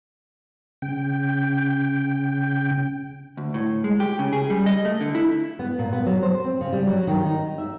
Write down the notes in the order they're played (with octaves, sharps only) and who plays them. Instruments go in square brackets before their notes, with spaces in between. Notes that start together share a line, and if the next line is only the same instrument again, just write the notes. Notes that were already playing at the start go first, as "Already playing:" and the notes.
[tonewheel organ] C#3 G5
[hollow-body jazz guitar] D2
A2
G#3
G4
C#3
G#4
G3
D#5
A3
D3
E4
[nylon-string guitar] B3
A#2
B3
F#3
C5
C4
C#3
G3
F#3
D#3
D#4
E5